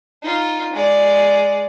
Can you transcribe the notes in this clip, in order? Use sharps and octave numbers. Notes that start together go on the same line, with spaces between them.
D#4 F4
G#3 D5